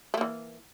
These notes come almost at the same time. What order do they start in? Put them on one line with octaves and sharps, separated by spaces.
A3 A#3 E3